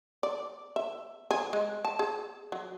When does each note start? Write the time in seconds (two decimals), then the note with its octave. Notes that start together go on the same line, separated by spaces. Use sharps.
0.23 D5
0.76 E5
1.31 G#4
1.53 G#3
1.85 A5
1.99 G#4
2.52 F#3